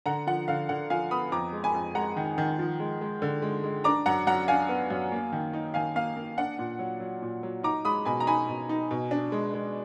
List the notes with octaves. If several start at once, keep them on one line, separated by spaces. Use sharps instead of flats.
D3 F#5 A#5
F3 F#5
D3 F5
D3 F#5
F3 F5 G#5
B3 B5 D#6
F2 A#5 D6
G#3
G#5 B5
F2
G#3 F#5 A#5
D#3
D#3
F3
G#3
G#3
D3
G#3
G#3
D4 A#5 D6
F#2 F#5 A#5
F#2 F#5 A#5
D4 F5 G#5
B3
F#2
A#3
D#3
D#4
D#3 F5 G#5
A#3 F5
A#3
D4 F#5
A#2
F#3
F#3
A#2
F#3
D#4 A#5 D6
G#3 B5 D#6
B2 G#5 B5
A#5
D#4 G#5 B5
B2
D#4
B2
D4
G#3
G#3